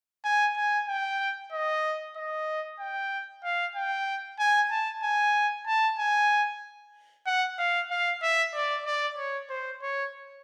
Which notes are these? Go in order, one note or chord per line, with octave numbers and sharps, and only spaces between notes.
G#5
G#5
G5
D#5
D#5
G5
F5
G5
G#5
A5
G#5
A5
G#5
F#5
F5
F5
E5
D5
D5
C#5
C5
C#5